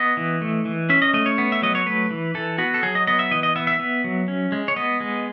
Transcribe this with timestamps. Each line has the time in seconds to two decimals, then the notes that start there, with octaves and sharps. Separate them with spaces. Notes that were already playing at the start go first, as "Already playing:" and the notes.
Already playing: B3 D#5
0.17 E3
0.42 A3
0.65 E3
0.90 C#4 E5
1.02 D#5
1.14 A3 D#5
1.26 C#5
1.38 B3
1.52 E5
1.62 F#3 D#5
1.75 C#5
1.86 A3 B4
2.11 E3
2.35 E3 A4
2.58 B3 F#4
2.74 A4
2.83 F#3 G#4
2.95 D#5
3.07 B3 D#5
3.19 E5
3.31 E3 D#5
3.43 D#5
3.56 B3 E5
3.67 E5
3.79 B3
4.04 F#3
4.28 C#4
4.52 G#3
4.68 C#5
4.76 B3 D#5
5.00 G#3